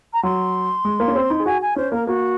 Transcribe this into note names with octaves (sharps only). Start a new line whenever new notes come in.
A#5
F#3 C6
G#3
A#3
C#4
C4
D#4
G#4
F#4 G#5
G#5
C#4 C5
A#3 A#4
A#3 F#4